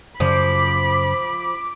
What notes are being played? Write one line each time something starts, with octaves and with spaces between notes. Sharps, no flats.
F#2 C#3 F3 B5 D6